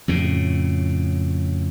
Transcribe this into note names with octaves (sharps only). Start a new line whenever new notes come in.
F2 A2 C#3